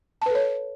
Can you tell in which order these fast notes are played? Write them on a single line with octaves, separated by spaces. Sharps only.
A5 B4 A4 C#5